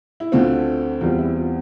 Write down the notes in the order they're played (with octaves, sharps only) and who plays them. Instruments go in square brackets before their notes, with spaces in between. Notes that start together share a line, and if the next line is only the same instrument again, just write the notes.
[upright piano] E4
D2 D3 A3 C4 F4
E2 E3 G3 C4 F4
E4
F4